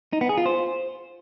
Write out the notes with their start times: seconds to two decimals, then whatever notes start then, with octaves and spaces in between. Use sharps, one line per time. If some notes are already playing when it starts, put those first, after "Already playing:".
0.13 D#4
0.21 B3
0.29 G#4
0.38 F4
0.46 C5